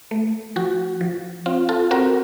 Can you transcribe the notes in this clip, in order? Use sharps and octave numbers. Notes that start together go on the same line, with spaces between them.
A3
F3 F#4
F3
C4 F4
F4 A4
C4 F#4 A#4